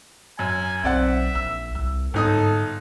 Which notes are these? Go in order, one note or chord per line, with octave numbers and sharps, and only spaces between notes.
F#2 G#5
B1 C4 D5 E5 F#5
A#1 E6
C2 E6
G1 G#2 D#4 A4 D#6